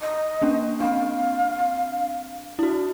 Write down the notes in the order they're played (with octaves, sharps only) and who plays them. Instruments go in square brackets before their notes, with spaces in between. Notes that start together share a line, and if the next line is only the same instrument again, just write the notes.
[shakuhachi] D#5
[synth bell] A#3 C#4 D4
[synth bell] C4 D4 [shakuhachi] F5
[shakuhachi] D4 [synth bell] E4 F#4